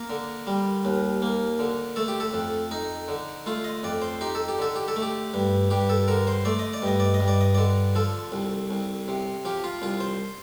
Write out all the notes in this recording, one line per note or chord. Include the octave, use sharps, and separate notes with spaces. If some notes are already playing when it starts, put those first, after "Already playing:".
Already playing: A#3 A#4
D3
G3
D#2
A#3
D3
A3 A4
G4
A4
F2
D#4
D3
A3 F4
D#5
F2 D5
C5
D#4 G4
A4
G4
D3 A4
G4
A4
A3
G4
G2
G2 G4
A4
D3 A#4
C5
A3 D5
D#5
D5
G2 D#5
D5
D#5
G2
D5
D#5
D3 D5
F3 A4
C2
C2
C3
F3 G4
F4
C2 F4
C5